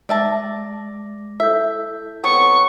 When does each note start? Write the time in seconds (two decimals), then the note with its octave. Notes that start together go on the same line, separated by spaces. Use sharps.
0.09 G#3 D5 E5 A5 D6 A#6
1.40 E4 A4 E5 G6
2.24 F#3 B3 C4 C#6